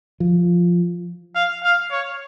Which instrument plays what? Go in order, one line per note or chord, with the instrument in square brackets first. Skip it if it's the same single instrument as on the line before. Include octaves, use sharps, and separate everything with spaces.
[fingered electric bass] F3
[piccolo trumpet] F5
F5
C#5